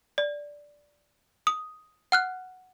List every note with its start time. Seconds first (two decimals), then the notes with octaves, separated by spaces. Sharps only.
0.18 D5
1.47 D#6
2.12 F#5 F6 F#6